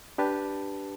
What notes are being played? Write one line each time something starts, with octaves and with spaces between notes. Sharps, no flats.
D4 G4 B4 A5